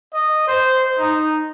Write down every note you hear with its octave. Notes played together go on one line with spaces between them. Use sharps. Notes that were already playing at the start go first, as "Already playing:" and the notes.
D#5
C5
D#4